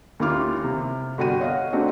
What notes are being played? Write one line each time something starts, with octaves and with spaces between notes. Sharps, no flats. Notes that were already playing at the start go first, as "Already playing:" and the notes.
D#2 C#4 E4 F4 D6 F6
C3
G1 F#4 G5 D#7
C#5 D#5 F5 F#5
A3 C4 D4 D#4 F#4 G#4